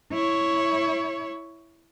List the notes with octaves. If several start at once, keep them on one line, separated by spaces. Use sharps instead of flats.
E4 C#5